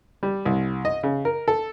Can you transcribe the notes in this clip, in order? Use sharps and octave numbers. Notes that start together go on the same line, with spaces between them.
G3
C2
D#5
C#3
A#4
A4